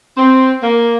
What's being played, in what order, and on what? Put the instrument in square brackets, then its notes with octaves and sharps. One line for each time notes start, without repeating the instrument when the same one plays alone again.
[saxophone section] C4
A#3